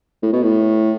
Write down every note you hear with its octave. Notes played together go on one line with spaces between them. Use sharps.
A2
B2
A2